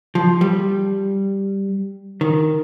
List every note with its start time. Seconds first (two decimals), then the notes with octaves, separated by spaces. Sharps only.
0.15 F3
0.41 G3
2.21 D#3